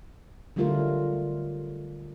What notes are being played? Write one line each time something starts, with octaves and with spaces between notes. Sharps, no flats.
D3 F#3 G3 A3 F4 A#4